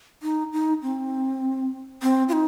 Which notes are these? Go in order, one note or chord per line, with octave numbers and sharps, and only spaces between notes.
D#4
D#4
C4
C4
F4
D#4